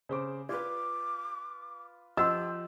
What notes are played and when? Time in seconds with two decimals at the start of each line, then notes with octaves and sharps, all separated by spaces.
0.09 C#3 C5 D6
0.49 F4 B4 D5 D6
2.17 F3 G4 D#5 F#5 C6 E6